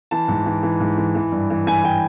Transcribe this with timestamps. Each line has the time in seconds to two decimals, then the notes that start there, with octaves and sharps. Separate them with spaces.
0.11 E3 A5
0.28 G#2
0.46 E3
0.63 E3
0.80 G#2
0.98 E3
1.15 E3
1.32 G2
1.50 E3
1.67 E3 G#5
1.84 E3 G5